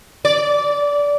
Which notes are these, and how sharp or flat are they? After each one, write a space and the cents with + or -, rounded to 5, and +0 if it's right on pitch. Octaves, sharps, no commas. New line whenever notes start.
D5 -20